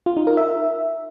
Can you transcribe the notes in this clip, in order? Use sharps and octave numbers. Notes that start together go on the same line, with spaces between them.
F4
D#4
A#4
E5